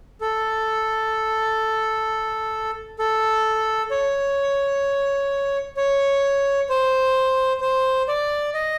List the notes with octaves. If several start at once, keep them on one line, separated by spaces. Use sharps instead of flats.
A4
A4
C#5
C#5
C5
C5
D5
D#5